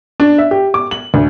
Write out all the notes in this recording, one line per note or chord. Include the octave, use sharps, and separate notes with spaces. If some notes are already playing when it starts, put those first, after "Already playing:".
D4
E5
G4
D6
F#7
D2